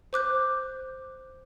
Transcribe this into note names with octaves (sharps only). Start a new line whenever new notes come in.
C5 D6 F#6 G6